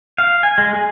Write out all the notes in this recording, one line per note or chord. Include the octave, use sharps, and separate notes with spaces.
F5
G#5
G#3
G#4